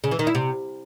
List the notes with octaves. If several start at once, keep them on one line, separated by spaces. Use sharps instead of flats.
C#3
E3
D#3
E4
C3